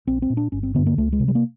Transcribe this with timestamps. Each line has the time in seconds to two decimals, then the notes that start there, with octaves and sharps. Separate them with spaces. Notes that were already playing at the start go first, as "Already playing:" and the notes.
0.07 A#1 C4
0.22 C4
0.30 A#2
0.37 D4
0.52 G1 C#4
0.63 C4
0.75 G2 D3 B3
0.87 A#3
0.98 C#2 A3
1.13 G#3
1.20 C3
1.28 G3
1.35 A#3